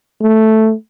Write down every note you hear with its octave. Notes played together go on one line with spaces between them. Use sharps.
A3